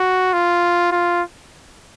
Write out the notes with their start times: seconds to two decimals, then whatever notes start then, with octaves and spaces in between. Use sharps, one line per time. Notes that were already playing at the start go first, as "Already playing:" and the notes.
Already playing: F#4
0.33 F4
0.92 F4